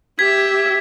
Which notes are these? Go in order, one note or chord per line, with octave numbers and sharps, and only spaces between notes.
G4 E5 G#6 B6